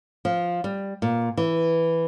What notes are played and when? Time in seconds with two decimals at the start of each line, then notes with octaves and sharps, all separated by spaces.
0.25 F3
0.64 G3
1.02 A#2
1.37 E3